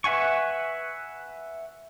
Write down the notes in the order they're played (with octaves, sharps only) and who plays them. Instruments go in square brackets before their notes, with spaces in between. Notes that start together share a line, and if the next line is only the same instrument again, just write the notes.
[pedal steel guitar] B4 E5 F#5 G#5 C#6